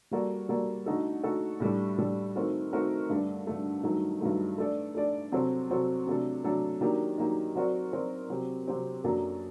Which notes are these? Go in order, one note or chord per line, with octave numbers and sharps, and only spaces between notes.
G3 A#3 F#4 A4 D5
G3 A#3 F#4 A4 D5
D3 A3 D#4 F#4 A4
D3 A3 D#4 F#4 A4
A2 G3 D4 A4
A2 G3 D4 A4
D#3 A3 C4 F#4 A#4
D#3 A3 C4 F#4 A#4
G2 D3 A3 D4
G2 D3 A3 D4
G2 D#3 F#3 A3
G2 D#3 F#3 A3
A3 D4 A4 D5
A3 D4 A4 D5
C3 F#3 C4 F#4 A4
C3 F#3 C4 F#4 A4
C3 F#3 A3 D4 A4
C3 F#3 A3 D4 A4
D#3 F#3 A#3 D4 G4
D#3 F#3 A#3 D4 G4
F#3 C4 F#4 A#4 D5
F#3 C4 F#4 A#4 D5
C3 F#3 C4 G4
C3 F#3 C4 G4
F#2 F#3 A#3 D4 A4